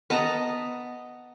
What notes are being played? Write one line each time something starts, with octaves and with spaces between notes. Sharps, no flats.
B3 D#5 A5 A#5